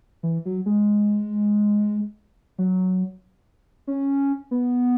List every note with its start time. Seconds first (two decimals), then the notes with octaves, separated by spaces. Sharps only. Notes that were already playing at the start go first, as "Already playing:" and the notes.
0.23 E3
0.45 F#3
0.66 G#3
2.58 F#3
3.87 C#4
4.51 B3